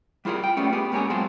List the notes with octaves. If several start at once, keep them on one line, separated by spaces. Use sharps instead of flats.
G3 E4 F4 G#4 A#4
G5
G3 A3 B3 C#4
B3 G4 G#4
G#2 A#3 C#4 G4 G#4
F#3 G#3 C4 F4 F#4 A4